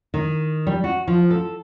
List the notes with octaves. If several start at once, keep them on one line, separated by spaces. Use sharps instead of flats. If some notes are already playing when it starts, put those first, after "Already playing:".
D#3
G3
F#4
F3
A4